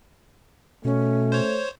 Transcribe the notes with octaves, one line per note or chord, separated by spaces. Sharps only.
B2 A3 C#4
C5 C#5